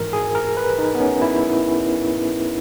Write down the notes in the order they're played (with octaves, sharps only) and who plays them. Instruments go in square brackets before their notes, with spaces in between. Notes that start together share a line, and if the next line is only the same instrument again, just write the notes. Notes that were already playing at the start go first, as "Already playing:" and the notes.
Already playing: [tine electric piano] G#1 G#2 E3 A#4
G#4
A#4
B4
D#4
B3
C#4
E4